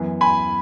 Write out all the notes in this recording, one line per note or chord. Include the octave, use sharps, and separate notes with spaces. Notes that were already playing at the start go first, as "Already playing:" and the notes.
Already playing: F#2 E3 B3
G#5 B5